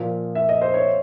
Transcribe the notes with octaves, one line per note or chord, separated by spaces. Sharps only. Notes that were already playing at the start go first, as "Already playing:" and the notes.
Already playing: A#2 F3
E5
D#5
C5
C#5